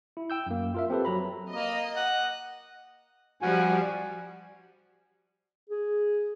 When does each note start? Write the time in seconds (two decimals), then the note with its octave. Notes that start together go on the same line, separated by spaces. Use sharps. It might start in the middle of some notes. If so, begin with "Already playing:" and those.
0.17 E4
0.30 G5 E6 G6
0.46 F#2 A#3
0.74 F4 A#4 E5
0.90 C4 G4 A4 B4
1.05 F#3 A#5 B5
1.51 A#3 D#5
1.96 F#5
3.42 F3 G3 F#4 G#5
5.70 G#4